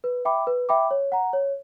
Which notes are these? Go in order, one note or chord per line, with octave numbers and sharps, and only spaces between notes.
B4
E5 G5 B5 D6
B4
E5 G5 B5 D6
C#5
F#5 A#5
C#5